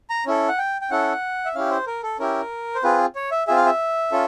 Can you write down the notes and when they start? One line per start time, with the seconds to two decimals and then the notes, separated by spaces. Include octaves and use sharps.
0.10 A#5
0.26 C#4 E4 A4
0.48 F#5
0.58 G5
0.81 G5
0.91 C#4 E4 A4 F#5
1.45 E5
1.55 C#4 E4 G4 F5
1.70 C5
1.87 A#4
2.03 A4
2.19 C#4 E4 G4 A#4
2.75 C5
2.83 C4 F4 G#4 B4
3.15 C#5
3.31 E5
3.48 C4 F4 G#4 E5
3.57 F5
3.66 E5
4.12 C#4 F4 A4